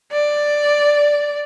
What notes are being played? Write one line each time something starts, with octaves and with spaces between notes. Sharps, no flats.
D5